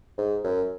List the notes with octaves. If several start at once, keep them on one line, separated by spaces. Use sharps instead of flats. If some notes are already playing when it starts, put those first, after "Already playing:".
G#2
F#2